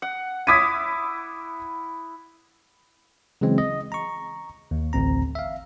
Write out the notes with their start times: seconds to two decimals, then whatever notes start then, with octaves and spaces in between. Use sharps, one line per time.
0.02 F#5
0.47 E4 D6 D#6 G#6 B6 D#7
3.41 C#3 E3 F#3 G#3 C4
3.58 D#5
3.92 A#5 C#6
4.71 D#2
4.93 A1 D2 C4 A#5
5.35 E5 F5